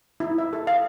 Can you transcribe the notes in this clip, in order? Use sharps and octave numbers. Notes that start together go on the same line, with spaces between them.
E4
E5
A4
F5